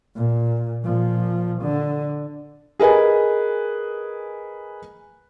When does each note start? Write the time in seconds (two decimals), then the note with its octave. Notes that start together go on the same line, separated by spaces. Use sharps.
0.15 A#2
0.84 A#2 F3
1.62 D3
2.80 G#4 A#4 B4 D#5 G#5